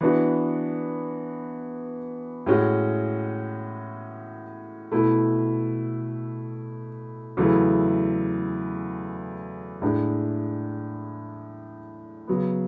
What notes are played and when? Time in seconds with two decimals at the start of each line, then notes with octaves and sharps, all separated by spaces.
0.01 E3 B3 D4 F#4
2.46 A2 G#3 C#4 F#4
4.92 B2 A3 E4
7.37 E2 C#3 F#3 A3 E4
9.82 A2 G#3 D4
12.27 C#3 F#3 B3